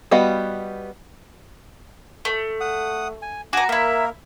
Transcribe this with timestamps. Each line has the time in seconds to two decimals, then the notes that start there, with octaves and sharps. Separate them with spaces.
0.11 G3 B3 F#4 D#5 F5
2.25 A3
2.61 F#5 D#6
3.22 G#5
3.53 F#4 G#5 A#5 D6
3.69 A#3 E4 A#4 E5